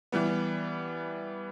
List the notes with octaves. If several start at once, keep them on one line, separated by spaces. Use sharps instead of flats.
E3 G3 B3